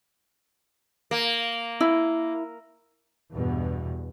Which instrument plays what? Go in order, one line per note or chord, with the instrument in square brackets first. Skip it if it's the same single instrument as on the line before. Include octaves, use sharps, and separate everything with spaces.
[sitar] A#3
[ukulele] E4
[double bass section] E2 G2 B2